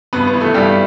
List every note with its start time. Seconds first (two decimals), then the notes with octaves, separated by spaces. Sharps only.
0.13 G2 B3 B4
0.27 B3 B4
0.34 E3
0.41 A3 A4
0.54 G2 G3 G4